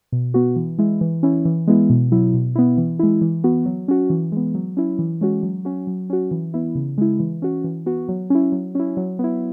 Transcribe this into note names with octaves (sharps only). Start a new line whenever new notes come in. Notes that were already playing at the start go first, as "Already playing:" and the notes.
B2
B3 F#4
E3
G#3 E4
E3
C#4 E4
E3
G#3 B3 E4
B2
F#3 E4
B2
B3 E4
E3
G#3 E4
E3
B3 F#4
F#3
C#4 F#4
E3
G#3 B3
F#3
C#4 E4
E3
G#3 C#4 F#4
F#3
C#4 F#4
F#3
C#4 F#4
E3
B3 E4
C#3
G#3 E4
E3
C#4 F#4
E3
B3 F#4
F#3
C#4 E4
F#3
C#4 E4
F#3
B3 E4